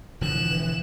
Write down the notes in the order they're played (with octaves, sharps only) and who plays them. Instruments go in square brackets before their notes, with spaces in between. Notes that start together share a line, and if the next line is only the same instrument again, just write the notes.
[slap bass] E1 D3 F3 [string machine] E3 [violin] F#6 E7